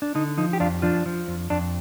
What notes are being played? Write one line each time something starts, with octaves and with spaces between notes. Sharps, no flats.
D4
D3 D#4
F3 D#4
G4
F2 D4 F4
F3 D4 F4
F3
F2
F2 D4